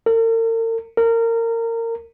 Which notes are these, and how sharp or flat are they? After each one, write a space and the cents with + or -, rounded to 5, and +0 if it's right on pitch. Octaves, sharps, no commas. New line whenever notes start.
A#4 -45
A#4 -25